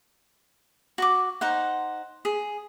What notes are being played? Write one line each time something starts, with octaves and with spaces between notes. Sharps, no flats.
F#4 C#6 D6
D#4 C5 F#5
G#4